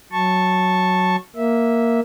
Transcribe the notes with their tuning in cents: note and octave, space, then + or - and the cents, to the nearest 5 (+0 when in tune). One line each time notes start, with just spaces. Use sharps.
F#3 +0 A5 +0 C#6 -10
A#3 +0 E5 -10